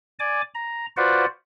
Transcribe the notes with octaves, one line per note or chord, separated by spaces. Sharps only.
D5 G#5 D6
A#5
F4 F#4 B4 C5 D5 F#5